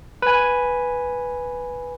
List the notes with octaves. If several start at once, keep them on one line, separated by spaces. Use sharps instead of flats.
B4 G#5